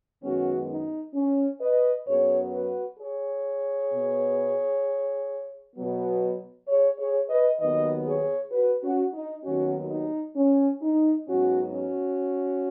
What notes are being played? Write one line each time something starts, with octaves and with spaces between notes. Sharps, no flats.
F#2 D#3 G#3 B3 C#4 F#4
D#4
C#4
B4 D#5
F#2 F#3 B3 G#4 C#5
F#4 B4
G#4 C#5
B2 B3
B2 F#3 B3
G#4 C#5
G#4 C#5
B4 D#5
D#2 D#3 F#3 B3 B4 D#5
G#4 C#5
F#4 B4
C#4 F#4
D#4
D#2 D#3 F#3 B3 C#4 F#4
D#4
C#4
D#4
G#2 F#3 B3 C#4 F#4
C#4 F#4